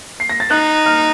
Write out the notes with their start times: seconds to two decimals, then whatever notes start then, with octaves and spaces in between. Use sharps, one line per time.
0.20 C7
0.29 A#6
0.40 A6
0.50 D#4 F#6
0.86 F6